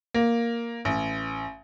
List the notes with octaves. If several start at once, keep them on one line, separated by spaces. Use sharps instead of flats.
A#3
A1